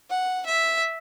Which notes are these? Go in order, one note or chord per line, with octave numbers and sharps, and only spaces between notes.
F#5
E5